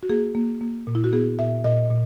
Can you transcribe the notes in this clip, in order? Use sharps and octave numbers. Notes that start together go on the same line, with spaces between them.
F#4
A#3 G#4
A#3
A#3
A#2
E4
F#4
B3 G#4
A#2 E5
A#2 D#5
A#2